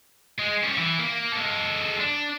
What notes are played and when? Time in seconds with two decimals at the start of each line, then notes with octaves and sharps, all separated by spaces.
0.39 G#3
0.64 G3 C#4
0.78 E3
0.99 A#3
1.33 G#3 A4
1.99 D4